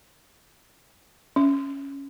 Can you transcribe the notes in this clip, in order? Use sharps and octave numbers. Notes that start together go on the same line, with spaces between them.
C#4